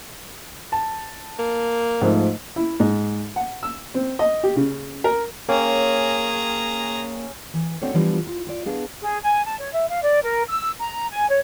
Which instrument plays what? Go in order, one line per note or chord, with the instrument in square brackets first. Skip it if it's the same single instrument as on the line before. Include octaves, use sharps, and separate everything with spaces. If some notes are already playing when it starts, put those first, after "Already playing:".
[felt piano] A5
[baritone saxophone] A#3
[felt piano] G#2 F3 A3
[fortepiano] E4
G#2
F#5
E6
C4
D#5
G4
C#3
A#4
[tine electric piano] A#3 [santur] C#4 G5 [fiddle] G#4 A#5
[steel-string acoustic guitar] E3
A3 C4 D4 F#4 A4 C#5
E3 F3 G3 B3 D4 F4
F4
F4 D5
B3 D4 G#4 F5
[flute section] G#4
G#5
A5
C#5
E5
F5
D5
A#4
E6
A#5
G#5
C#5